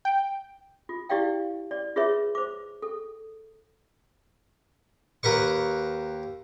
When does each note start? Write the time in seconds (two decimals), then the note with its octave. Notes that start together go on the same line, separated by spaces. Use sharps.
0.05 G5
0.89 F4
1.09 E4 G4 D5 F5 G5
1.71 D5
1.96 F4 G#4 B4 C#5 E5
2.35 C5 D6
2.82 A4
5.23 D#2 A#4 B4 C#6